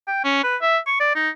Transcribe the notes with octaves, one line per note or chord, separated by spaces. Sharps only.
G5
C#4
B4
E5
C#6
D5
D#4